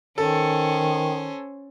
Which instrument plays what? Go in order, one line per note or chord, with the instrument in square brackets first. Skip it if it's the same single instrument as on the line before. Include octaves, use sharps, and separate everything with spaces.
[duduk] D#3 [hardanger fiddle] C#4 C5 [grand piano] A4